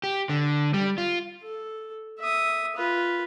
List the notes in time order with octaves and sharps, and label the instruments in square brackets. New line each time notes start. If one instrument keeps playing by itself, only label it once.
[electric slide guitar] G4
D3
G3
F4
[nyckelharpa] A4
E5 D#6
F4 B4